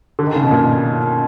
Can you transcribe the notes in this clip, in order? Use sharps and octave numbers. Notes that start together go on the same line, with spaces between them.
D3
D#3
C#3
B2
A#2